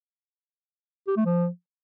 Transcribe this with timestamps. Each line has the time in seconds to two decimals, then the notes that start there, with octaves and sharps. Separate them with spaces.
1.08 G4
1.17 A3
1.25 F3